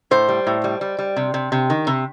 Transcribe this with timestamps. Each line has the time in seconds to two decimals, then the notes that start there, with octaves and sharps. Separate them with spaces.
0.11 A2 C5
0.29 G3
0.47 A2
0.64 G3
0.81 G3
0.98 G3
1.16 C3
1.34 C3
1.52 C3
1.70 D#3
1.87 C3